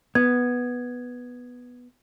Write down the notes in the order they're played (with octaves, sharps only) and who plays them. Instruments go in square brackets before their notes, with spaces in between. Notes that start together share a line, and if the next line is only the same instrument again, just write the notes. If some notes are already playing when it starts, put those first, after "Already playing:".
[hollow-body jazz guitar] B3 [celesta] G#6